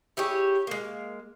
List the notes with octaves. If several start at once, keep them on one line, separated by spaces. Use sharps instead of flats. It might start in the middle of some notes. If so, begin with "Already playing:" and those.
E4 G4 G#4 C#5
G#3 A#3